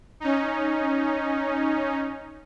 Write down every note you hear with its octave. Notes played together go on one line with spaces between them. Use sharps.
C#4 D#4